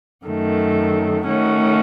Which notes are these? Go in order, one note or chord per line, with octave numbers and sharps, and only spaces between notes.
F#2 D#3 A3
D#3 A3 C#4 F#4